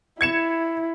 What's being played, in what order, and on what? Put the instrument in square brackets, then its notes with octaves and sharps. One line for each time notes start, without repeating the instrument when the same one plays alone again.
[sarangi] E4 [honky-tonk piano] G#6 C#7 E7